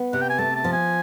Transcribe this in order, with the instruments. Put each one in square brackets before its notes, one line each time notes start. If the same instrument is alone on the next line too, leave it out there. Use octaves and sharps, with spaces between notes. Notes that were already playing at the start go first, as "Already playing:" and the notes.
Already playing: [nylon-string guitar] B3
[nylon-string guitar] C3 [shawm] F#5
[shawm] G5
G#5
[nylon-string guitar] A3 [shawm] A5
[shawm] A5
[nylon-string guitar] F3
[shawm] G#5